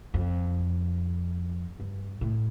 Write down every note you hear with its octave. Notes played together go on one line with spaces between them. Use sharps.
F2
G2
A2